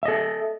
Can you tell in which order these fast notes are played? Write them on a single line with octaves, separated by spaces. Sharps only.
E5 D#5 A4